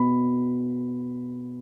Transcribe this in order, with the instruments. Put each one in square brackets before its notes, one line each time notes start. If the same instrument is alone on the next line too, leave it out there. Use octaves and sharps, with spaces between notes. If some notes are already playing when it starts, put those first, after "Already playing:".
Already playing: [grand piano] B2 B5